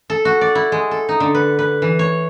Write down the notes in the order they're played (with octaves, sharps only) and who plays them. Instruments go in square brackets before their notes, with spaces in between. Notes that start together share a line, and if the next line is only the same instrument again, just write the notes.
[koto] A4
F#4
D5
E4
G#3
A4
D#4
D3
B4
B4
E3
C#5